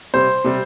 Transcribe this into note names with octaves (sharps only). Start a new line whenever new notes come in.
C3 G3 C5
C3 G3